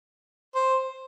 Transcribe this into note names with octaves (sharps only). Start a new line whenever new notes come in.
C5